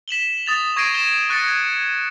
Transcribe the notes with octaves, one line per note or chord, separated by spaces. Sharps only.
B6 E7 F#7 G7
D#6 A6 F7
C#6 G#6 A#6 C7 D7 D#7
A#6 E7 G7
C#6 F#6 A6 A#6 C#7
G#6